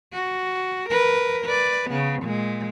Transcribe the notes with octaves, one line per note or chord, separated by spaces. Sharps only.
F#4
A#4 B4
B4 D5
C#3 B3
A#2 G#3